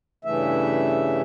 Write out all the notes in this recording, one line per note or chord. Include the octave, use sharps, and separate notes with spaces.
G2 C#3 E3 A3 E5